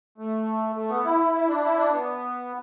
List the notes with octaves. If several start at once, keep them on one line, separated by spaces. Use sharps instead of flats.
A3
A3
B3
E4
E4
D4
E4
D4
B3